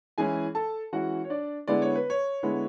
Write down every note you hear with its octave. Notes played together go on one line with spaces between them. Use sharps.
E3 G#3 C#4 E4 G#4 G#5
A4 A5
E3 G#3 C#4 E4 F#4 F#5
C#5
D4 D5
D3 G#3 B3 E4 D5
C#5
B4
C#5
D3 G#3 B3 E4